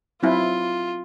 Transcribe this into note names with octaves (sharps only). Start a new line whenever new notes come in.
F#3 C4 E4 F4